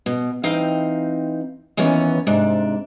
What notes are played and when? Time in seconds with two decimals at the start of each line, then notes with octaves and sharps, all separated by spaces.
0.06 B2
0.43 E3 C4 D#4 F5 G5
1.77 D#2 E3 B3 C#4 C#5
2.27 G#2 C3 D4 D5